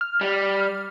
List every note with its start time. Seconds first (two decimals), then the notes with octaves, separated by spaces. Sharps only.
0.01 F6
0.21 G3